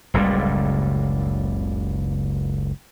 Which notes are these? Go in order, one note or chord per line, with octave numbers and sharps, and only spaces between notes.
F#1 C#2 A2 G3